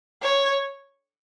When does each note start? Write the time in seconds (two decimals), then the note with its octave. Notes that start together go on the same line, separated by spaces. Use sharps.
0.22 C#5